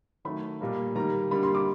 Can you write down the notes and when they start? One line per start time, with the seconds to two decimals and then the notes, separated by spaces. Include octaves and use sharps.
0.25 D#3 F#3 A3 B5
0.61 A#2 G3 A#3
0.95 D#3 G3 A#3 A#5
1.31 D3 G3 A#3 B5
1.43 C6
1.55 D6